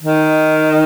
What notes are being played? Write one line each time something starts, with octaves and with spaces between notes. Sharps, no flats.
D#3